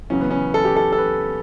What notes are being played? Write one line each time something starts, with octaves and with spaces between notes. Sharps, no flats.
E2 C#3 F#3 C#4
B3
C#4
A4
G4
A4
A4
B4